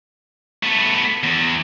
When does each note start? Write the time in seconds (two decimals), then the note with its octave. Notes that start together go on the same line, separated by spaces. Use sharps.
0.63 A3 B3
1.23 E2